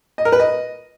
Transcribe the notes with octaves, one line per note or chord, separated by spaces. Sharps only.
D#5
A#4
B4
D#5